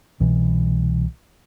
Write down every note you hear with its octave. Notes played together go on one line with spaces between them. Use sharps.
C2 B2 E3